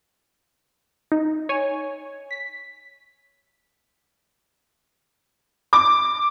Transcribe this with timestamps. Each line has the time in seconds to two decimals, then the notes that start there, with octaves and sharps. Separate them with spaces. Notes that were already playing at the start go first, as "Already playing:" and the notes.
1.12 D#4
1.49 C#5 G#5
2.31 B6
5.73 D6